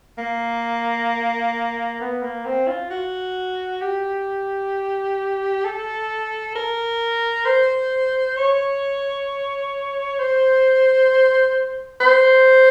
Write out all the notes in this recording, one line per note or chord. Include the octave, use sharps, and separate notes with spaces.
A#3
B3
A#3
C4
F4
F#4
G4
A4
A#4
C5
C#5
C5
C5